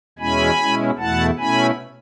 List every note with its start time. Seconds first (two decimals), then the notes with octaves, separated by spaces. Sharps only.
0.18 E2 B2 G#3 C#4 E4 G#5 B5
0.59 B2 G#3 C#4 E4
0.98 E2 B2 A3 E4 F#5 A5
1.38 B2 A3 C#4 E4 G#5 B5